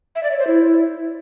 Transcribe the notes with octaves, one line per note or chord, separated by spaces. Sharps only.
E5
D5
C#5
C5
E4